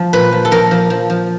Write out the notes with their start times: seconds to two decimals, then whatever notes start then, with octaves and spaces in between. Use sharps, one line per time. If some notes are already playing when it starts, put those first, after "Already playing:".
Already playing: F3
0.13 A#2 B4
0.32 F3
0.45 A4
0.51 F3 A#4
0.71 F3
0.90 F3
1.10 F3